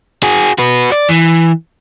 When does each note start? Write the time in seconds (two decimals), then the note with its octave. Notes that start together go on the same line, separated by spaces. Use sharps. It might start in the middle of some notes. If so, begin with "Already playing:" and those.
0.23 F#4 G#4
0.58 F#4 B4
0.92 D5
1.09 E3